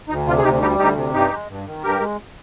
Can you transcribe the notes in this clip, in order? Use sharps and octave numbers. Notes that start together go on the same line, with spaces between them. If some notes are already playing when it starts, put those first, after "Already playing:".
D2 D#4
C3 F4
G#4
D2 D#4 G4
G3 D#4 G4
D2 D#4 G4
C3
G2 D#4 G4
G#3
G2
D#3
G2 G4 A#4
G#3